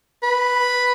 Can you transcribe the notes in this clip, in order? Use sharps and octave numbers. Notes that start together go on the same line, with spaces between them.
B4